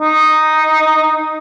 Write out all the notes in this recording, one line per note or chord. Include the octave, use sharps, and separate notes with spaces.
D#4